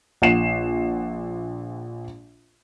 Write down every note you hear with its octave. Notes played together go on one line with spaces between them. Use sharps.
A#1 F#5 C7 E7